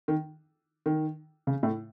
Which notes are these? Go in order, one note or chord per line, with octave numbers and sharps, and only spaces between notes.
D#3
D#3
C#3
A2